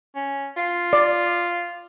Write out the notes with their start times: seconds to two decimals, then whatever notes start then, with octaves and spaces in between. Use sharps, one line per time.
0.15 C#4
0.56 F4
0.93 D5